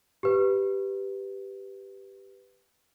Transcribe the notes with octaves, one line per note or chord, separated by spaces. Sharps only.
G4 B4